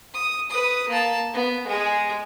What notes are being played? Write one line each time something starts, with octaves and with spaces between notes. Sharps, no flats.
D#6
B4 D#6
A#3 A5
B3
G#3 G#4